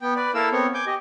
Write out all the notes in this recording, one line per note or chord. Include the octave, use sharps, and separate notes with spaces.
B3 G5
B4 D5
A#3 E4 A4 A#4 F5 E6
B3 C4 C#5
G#5 D6 G6
G4 D#5